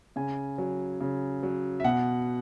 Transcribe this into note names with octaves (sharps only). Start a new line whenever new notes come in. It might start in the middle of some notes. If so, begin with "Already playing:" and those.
C#3 G#5
F#3
C#3
F#3
E5
B2 F#5